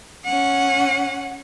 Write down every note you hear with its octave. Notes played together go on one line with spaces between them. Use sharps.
C#4 F#5